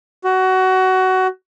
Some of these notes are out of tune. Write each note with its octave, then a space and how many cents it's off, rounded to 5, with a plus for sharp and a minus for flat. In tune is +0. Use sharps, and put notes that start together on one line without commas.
F#4 +20